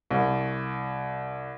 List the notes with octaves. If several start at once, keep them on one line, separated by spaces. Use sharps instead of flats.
C2